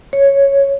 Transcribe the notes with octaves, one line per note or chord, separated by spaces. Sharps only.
C#5